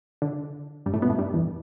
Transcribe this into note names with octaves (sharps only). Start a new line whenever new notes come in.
D3
G2 G3
A2 A3
B2 B3
A2 A3
G2 G3
E2 E3